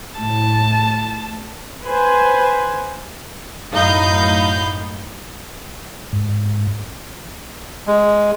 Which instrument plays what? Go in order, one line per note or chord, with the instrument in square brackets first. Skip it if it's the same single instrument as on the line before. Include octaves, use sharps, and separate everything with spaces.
[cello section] A2 [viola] A5
[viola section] B4 C5 G#5
[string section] F#2 A2 D#4 F5 B5 G6
[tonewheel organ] G#2
[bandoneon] G#3